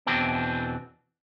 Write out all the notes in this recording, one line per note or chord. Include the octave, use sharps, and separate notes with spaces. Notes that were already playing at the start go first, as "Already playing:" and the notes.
E2 B2 E3 C4 D4